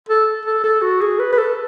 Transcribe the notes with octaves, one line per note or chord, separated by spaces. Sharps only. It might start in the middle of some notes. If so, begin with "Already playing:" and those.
A4
A4
A4
F#4
G#4
B4
B4
A4